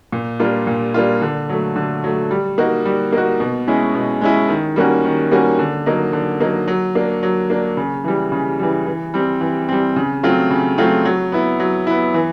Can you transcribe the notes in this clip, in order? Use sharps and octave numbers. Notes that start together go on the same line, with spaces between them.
A#2
G3 A#3 D4 F4
A#2
G3 A#3 D4 F4
D3
F#3 A3
D3
F#3 A3
G3
A#3 D#4 F#4
G3
A#3 D#4 F#4
B2
G#3 C#4 E4
B2
G#3 C#4 E4
D#3
G3 A#3 C#4 F#4
D#3
G3 A#3 C#4 F#4
D3
F#3 A#3 D#4
D3
F#3 A#3 D#4
F#3
A#3 D4
F#3
A#3 D4
C#3
E3 G3
C#3
E3 G3
E3
G3 C4
E3
G3 C4
C#3
F#3 A3 C4 F4
C#3
F#3 A3 C4 F4
F#3
B3 E4
F#3
B3 E4
E3